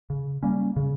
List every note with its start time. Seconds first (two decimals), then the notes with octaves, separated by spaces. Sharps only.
0.10 C#3
0.43 G3 A#3 C#4
0.76 C#3